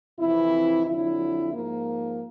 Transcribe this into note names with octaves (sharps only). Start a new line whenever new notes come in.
F2 C3 E3 E4
F2 D3 F#3 E4
G#2 F3 A#3